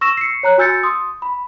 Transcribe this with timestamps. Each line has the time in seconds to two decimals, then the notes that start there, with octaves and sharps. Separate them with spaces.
0.01 C#6 E6 A#6 E7
0.17 C7 C#7
0.43 C#5 A#5 F#6
0.58 F#4 G#5 E6 G6 A6 C#7
0.83 C6 D#6
1.22 B5